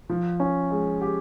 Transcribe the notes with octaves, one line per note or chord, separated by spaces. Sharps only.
F3
C#4
G#3
G4